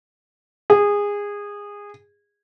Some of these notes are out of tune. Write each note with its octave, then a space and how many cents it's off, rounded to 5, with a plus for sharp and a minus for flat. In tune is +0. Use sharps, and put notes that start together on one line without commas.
G#4 -20